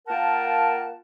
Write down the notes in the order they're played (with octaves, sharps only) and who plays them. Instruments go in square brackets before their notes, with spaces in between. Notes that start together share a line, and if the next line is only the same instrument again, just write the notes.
[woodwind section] A#3 F4 A#4 F#5 G5 A5